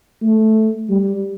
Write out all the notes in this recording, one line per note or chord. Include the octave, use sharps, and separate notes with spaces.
A3
G3